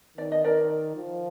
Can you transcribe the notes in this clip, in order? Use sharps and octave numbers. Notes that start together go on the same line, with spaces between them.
D#3 D5
D#5
A#4 D5
F3